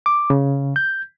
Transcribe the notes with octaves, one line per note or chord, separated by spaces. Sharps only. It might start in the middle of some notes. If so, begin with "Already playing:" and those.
D6
C#3
G6